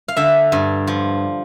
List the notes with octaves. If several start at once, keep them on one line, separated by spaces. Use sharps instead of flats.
F5
D3 E5
G2
F3